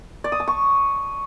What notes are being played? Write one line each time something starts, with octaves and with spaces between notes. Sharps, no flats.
D5
D#6
A5
C#6